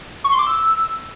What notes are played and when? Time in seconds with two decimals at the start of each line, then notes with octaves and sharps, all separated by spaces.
0.24 C#6
0.32 C6
0.39 D6
0.46 E6